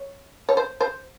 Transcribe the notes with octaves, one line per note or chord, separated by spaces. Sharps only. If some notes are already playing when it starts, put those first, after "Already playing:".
Already playing: C#5
C#5
C5
C5